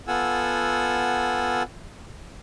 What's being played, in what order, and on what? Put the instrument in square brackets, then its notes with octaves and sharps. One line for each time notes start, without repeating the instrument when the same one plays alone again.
[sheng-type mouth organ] B3 F4 A4 F#5 G#5 E6